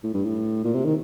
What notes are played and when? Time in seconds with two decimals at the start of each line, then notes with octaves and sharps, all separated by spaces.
0.04 A2
0.14 G2
0.25 A2
0.65 A#2
0.74 C3
0.85 D#3